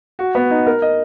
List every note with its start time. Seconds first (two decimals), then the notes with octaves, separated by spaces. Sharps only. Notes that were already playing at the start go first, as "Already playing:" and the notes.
0.19 F#4
0.35 B3
0.50 D#4
0.66 A#4
0.82 D#5